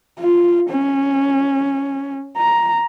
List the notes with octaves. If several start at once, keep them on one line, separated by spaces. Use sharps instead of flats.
F4
C#4
A#5